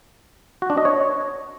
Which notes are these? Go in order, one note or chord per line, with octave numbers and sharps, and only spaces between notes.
F#4
D4
D#5
C#5